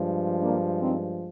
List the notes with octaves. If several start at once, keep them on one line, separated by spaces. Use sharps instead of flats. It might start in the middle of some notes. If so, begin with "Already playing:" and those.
Already playing: G2 F3 G#3
A#3 D4
C4 D#4